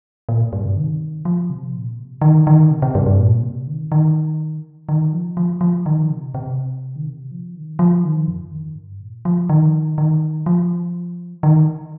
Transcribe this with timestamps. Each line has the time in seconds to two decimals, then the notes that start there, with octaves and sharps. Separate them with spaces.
0.29 A#2
0.53 G2
0.64 C3
0.77 D#3
1.25 F3
1.50 C3
1.74 A#2
1.98 C3
2.21 D#3
2.47 D#3
2.71 C3
2.82 C3
2.95 G2
3.06 G2
3.19 A#2
3.43 C3
3.67 D#3
3.92 D#3
4.89 D#3
5.13 F3
5.37 F3
5.61 F3
5.86 D#3
6.10 C3
6.35 C3
6.96 D#3
7.07 C3
7.31 F3
7.56 D#3
7.79 F3
8.04 D#3
8.28 F2
8.52 D#3
8.76 G2
9.00 A#2
9.25 F3
9.49 D#3
9.98 D#3
10.46 F3
11.43 D#3